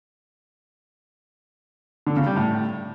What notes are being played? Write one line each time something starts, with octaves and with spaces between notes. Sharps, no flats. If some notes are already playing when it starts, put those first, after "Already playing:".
D3
C#3
G3
A2